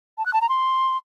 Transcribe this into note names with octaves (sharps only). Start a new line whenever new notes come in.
A5
F#6
A5
A#5
C6